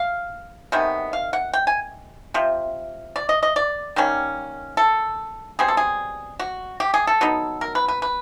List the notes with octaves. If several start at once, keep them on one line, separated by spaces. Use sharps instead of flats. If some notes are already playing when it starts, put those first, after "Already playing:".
Already playing: F5
C3 D#3 G#3 B3
F5
F#5
G5
G#5
C3 F3
D5
D#5
D#5
D5
D#3 G3 A#3 C#4
A4
B2 G3 C4 G#4
A4
G#4
F#4
G4
G#4
A4
F#3 B3 D#4
A#4
B4
B4
B4